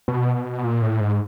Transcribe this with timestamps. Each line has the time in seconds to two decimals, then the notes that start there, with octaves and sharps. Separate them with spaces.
0.08 B2
0.64 A#2
0.82 A2
1.01 G#2